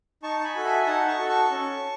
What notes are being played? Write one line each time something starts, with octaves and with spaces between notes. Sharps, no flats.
D#4 A5 C#6
C#6
G#5 B5
F#4 A4
E5 G#5
D#4 F#5 A5
A5 C#6
F#4 A4
A5 C#6
C#4